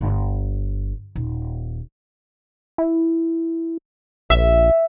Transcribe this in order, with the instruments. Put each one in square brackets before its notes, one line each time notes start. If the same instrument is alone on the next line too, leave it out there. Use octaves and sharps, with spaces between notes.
[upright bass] G1
D#1
[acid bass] E4
[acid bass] A#1 [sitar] E5